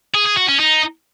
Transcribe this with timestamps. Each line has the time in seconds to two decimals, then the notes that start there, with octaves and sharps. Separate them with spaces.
0.15 G#4
0.26 G#4
0.37 F#4
0.49 C#4
0.60 D#4